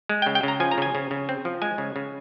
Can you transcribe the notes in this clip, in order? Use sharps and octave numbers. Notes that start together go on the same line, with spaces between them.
G#3
G5
C#3
G5
C#3 A#5
F3 G#5
A#5
C#3 G#5
C#3
C#3
C4
F3
G#3 G#5
C#3
C#3